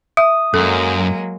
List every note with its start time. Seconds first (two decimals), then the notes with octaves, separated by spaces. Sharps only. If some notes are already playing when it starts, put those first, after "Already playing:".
0.17 E5 D#6
0.54 F#2 F#3 G#3 A#3 A4